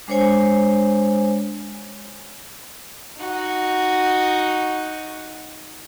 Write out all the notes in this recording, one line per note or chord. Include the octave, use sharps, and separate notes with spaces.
G#3 D4 C5 C#5 G#5
D#4 F#4